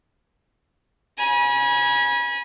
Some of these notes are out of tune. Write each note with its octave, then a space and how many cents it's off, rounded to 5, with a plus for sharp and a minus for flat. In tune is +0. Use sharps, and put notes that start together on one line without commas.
G#5 -5 B5 -40